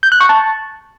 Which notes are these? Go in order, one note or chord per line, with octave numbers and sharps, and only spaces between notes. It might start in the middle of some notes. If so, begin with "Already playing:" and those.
G6
F#6
C#6
A5